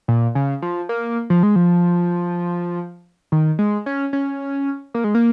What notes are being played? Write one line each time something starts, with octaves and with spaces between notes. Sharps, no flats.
A#2
C#3
F3
A#3
F3
G#3
F3
D#3
G#3
C#4
C#4
A#3
G#3
A#3